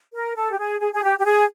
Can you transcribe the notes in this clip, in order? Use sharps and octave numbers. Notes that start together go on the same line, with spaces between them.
A#4
A4
G4
G#4
G#4
G#4
G4
G4
G#4